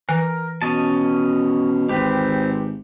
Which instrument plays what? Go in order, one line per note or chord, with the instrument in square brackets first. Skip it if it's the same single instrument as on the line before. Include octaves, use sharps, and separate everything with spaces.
[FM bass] E3 [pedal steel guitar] A#4
[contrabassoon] B2 [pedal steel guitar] C#4 D#5 A5
[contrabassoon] G#1 [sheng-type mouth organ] C4 [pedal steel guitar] G4 B4